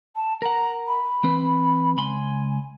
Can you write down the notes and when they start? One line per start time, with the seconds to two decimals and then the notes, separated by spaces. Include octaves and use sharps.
0.15 A5
0.42 A#4 F#5 A#5
0.87 B5
1.24 E3 C4 B4
1.97 C#2 G#5 B5 C6